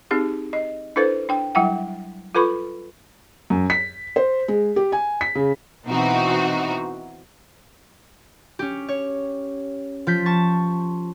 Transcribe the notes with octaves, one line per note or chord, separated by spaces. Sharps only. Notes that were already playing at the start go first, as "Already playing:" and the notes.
C4 D#4 G4 G#4
D#5
D4 E4 A4 B4 C5
D4 G5
F#3 G3 E4 F#5 G5
F4 A4 B4 B5 C#6
F#2
B6
C5
G#3
G4
G#5
B6
C#3
B2 E3 C4 D#4 F#4
C#4 G4
C#5
F3 F4 G6 B6
A5 C#6 A6